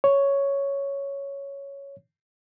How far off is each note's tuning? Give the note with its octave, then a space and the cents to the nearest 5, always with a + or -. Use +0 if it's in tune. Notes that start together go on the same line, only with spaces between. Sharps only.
C#5 +5